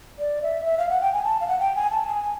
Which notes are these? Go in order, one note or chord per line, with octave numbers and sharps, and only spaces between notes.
D5
E5
E5
F5
F#5
G5
G#5
A5
F5
F#5
G5
G#5
A5
G#5